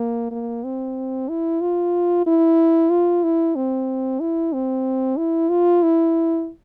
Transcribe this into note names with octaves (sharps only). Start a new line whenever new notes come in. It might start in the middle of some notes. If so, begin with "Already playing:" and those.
Already playing: A#3
A#3
C4
E4
F4
E4
F4
E4
C4
E4
C4
E4
F4
E4